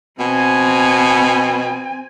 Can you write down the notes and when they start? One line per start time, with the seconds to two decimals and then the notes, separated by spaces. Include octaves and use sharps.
0.20 B2 C4 G#5